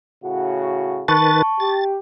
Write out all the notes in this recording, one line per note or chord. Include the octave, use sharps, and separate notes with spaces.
A2 C#3 F#4
D#3 B4 A5 C#6 A6
G4 A6